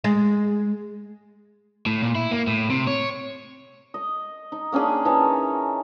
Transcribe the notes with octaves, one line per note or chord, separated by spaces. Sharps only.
G#3
A2
A#2
E4
A#3
A2
C3
C#5
D#5
D#4
A#3 C#4 D4 G#4
E3 D#4 C#5 A5